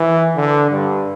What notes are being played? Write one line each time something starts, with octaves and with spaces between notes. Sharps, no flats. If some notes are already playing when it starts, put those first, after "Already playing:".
Already playing: E3
D3
G2